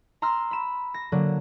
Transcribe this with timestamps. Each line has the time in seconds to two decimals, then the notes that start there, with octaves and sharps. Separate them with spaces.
0.22 A#5 C6 E6 F6
0.51 B5 E7
0.94 A#6
1.12 D3 F#3 A#3